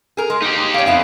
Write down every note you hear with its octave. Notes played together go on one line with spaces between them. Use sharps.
G#4 A#4
G#3
D#4 G4
C#5 F5
F2 B3 E5 F5